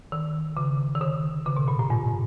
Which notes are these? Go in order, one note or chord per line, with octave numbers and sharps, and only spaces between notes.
D#3
C#3
D#3
D3
C#3
B2
A#2
A2
G2